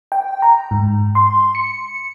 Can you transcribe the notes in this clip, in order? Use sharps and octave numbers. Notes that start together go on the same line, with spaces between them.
G5
A#5
G#2
C6
C#7